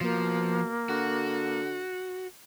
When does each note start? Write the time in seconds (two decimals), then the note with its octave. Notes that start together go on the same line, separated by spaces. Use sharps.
0.01 B2 F3 A#3
0.89 D3 F#4